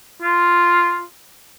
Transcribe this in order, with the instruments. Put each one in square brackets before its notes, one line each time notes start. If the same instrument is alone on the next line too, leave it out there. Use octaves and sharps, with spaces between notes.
[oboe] F4